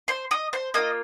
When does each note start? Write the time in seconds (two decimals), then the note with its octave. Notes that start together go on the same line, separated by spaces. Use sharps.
0.08 C5 C6
0.31 D#5 D#6
0.53 C5 C6
0.74 A#3 F4 D#5 D#6